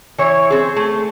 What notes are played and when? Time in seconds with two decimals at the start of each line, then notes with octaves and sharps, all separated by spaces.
0.18 E3 C#5
0.50 C4 G#4
0.76 A3